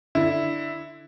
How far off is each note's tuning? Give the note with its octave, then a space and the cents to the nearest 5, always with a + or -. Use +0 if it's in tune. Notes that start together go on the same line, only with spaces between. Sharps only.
D3 +0 E4 +0